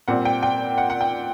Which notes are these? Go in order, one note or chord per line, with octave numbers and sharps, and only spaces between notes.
A#2 G3 C4 F#5
G5
G5
F#5
F#5
G5